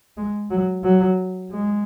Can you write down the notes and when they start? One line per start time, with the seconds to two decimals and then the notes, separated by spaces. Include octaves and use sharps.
0.17 G#3
0.50 F#3
0.84 F#3
1.52 G#3